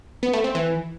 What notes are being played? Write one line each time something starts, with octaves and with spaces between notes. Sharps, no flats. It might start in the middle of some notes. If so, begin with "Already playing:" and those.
B3
A3
C4
E3